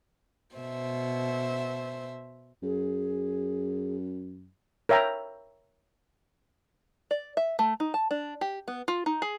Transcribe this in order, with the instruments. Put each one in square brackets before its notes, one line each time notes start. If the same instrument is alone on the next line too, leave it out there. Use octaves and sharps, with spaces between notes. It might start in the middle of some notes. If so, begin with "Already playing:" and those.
[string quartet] B2 C5 E5
[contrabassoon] F#2 [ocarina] G#4
[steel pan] A#4 C#5 E5 G5 A#5
[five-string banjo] D5
E5
A3
D#4
A5
D4
G4
B3
F4
D#4
G#4